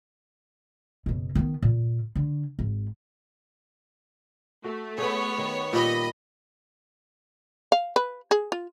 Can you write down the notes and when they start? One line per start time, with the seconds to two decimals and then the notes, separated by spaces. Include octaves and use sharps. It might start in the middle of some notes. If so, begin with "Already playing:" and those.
1.06 F#1 B2
1.35 D#3 B3
1.62 A#2
2.15 D3
2.59 G#1
4.64 A3 F#4
4.98 B3 G#4 B4 C#5 C#6
5.38 D#3
5.73 A#2 G3 D#5 B5
7.72 F5
7.96 B4
8.31 G#4
8.52 F4